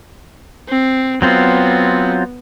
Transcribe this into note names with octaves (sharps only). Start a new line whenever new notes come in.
C4
F#3 B3 C4 F4